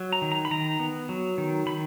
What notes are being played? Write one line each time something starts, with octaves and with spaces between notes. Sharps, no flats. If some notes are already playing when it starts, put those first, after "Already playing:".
Already playing: F#3
A#5
D#3
A#5
B5
D#3 A#5
B3
F#3
D#3
D#3 B5